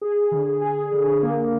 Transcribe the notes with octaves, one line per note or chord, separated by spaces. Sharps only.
G#4
D3
G#4
D3
A#3